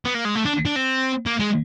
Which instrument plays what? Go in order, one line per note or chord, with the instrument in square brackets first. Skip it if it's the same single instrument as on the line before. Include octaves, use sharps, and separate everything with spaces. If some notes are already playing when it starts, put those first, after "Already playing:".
[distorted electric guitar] B3
A#3
G#3
A3
D4
D4
C4
A#3
G#3